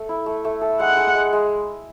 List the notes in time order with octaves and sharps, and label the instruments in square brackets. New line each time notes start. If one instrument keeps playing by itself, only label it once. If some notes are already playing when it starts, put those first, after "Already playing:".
Already playing: [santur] A3 A4
E4
A3
A3
A4
[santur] G#3 [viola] F#5
[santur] G#3
G#3
G#3